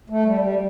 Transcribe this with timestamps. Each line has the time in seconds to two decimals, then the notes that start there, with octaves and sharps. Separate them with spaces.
0.10 A3
0.26 G3
0.41 G3